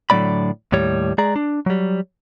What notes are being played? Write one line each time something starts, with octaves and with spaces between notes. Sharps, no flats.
A2 D3 F#3 A3 D5 B5
D#2 A2 G3 C#5
G#3 G#4 D5 A#5
D4
F#3 G3